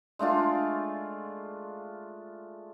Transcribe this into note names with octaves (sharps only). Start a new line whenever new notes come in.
G#3 A3 D4 F4